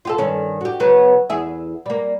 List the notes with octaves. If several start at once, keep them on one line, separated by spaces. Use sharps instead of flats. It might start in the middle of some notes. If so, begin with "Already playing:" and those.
F4 G4 A4
G2 D#3 C#4
F#4 G4
C#3 F#3 B3
E2 G#4 E5
G3 A#3